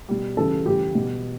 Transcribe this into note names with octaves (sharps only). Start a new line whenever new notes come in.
B2 G3
C#3 E3 G3 A4
C#3 E3 G3 G4
B2 G3